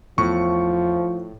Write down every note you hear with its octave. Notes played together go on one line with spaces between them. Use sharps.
E2 A2 F3 C#6